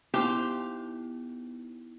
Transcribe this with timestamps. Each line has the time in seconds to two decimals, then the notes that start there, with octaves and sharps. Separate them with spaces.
0.14 B3 D#4 E4 G4 C5 F5 C6